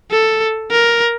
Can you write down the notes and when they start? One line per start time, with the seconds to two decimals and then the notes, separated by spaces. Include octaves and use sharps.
0.11 A4
0.71 A#4